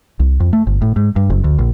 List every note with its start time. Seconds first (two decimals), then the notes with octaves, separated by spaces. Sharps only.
0.20 C2
0.40 F2
0.53 A3
0.67 G1
0.82 A2
0.96 G#2
1.16 G2
1.30 F#1
1.44 D2
1.58 A#1